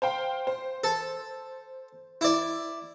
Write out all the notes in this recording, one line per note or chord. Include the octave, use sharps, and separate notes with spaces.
C5 F5 G5
C5
A4
E4 D5